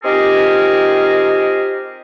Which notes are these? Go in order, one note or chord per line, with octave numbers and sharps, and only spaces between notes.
C4 D#4 F4 G4 G#4 A#4